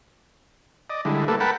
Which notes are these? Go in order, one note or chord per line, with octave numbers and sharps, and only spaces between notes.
D5 D#5
D3 G3 G#3 E4
G3 A3 A#3 A4 B4
A#4 B4 F#5 G5 A5 B5